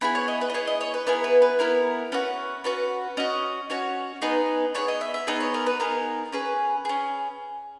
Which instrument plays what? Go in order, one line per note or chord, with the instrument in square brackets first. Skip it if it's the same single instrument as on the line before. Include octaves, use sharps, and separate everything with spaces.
[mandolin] B3 E4 G#4 B5
C#5
D#5
B4
D#5
B3 E4 G#4 C#5
D#5
C#5
B4
B3 E4 G#4 A#4
B4
B4
B3 E4 G#4 A#4
C#4 F#4 B4
C#4 F#4 B4
C#4 F#4 D#5
C#4 F#4 C#5
B3 D#4 G#4 B4
B3 D#4 G#4 C#5
D#5
E5
E5
B3 D#4 G#4 D#5
C#5
A#4
B4
B3 D#4 G#4 A#4
C#4 G#4 B4
C#4 G#4